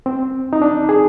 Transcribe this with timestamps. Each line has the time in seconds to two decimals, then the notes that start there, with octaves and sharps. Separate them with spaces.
0.06 C4
0.53 D#4
0.62 D4
0.89 G#4